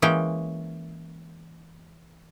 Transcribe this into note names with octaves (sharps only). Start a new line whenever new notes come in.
E3 G#3 A#3 C#4 G5